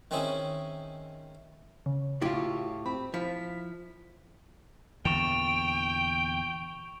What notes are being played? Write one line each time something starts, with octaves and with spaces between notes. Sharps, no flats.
D#3 C4 C#4 E4 G#4
C#3
A2 F#3 E4 F4 G4 C#6
C4 B5
F3 E4 B6
E2 A#2 D3 G5 C#6 E7 F7